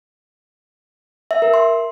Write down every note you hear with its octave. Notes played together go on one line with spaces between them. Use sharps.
E5
A#4
C6